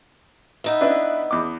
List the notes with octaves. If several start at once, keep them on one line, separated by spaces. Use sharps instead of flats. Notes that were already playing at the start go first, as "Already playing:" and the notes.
B3 D#4 E5
D4 E4 B4
E2 D6